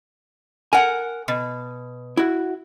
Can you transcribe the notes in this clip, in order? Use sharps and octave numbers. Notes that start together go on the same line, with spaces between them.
A#4 F#5 G#5
B2
E4 F#4